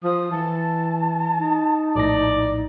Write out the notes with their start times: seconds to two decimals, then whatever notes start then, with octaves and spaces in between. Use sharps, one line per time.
0.04 F3 D#6
0.31 E3 A5
1.38 D#4
1.96 A#1 A2 D5 A#6